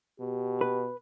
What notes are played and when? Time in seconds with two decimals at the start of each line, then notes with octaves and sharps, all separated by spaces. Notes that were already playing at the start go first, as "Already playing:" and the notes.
0.20 B2 G4
0.61 B4